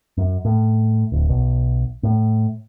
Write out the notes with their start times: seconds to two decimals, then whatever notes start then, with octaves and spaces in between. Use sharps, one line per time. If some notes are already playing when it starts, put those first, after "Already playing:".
0.17 F#2
0.45 A2
1.12 D1
1.29 B1
2.03 A2